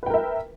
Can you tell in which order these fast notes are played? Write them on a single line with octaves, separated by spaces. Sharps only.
B4 G5 A#4 E5